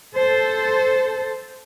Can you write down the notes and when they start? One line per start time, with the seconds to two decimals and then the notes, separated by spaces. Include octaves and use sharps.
0.16 A4 C5